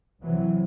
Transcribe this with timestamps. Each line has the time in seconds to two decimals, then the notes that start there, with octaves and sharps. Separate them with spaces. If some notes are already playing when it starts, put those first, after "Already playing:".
0.22 C2 C3 E3 F#3